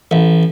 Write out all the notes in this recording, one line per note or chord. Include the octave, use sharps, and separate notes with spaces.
A1